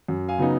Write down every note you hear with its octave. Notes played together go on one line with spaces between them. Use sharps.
F#2
F5 G#5
C#3 F#3 B3 D#4